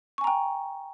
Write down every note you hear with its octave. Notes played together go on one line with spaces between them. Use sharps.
G5 G#5 A#5 C#6